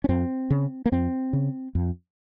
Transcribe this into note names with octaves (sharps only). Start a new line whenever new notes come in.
C#4
F2 C4
C#3
A#3
F2 C4
C#3
F2